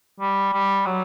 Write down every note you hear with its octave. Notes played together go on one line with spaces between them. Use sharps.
G3
G3
F#3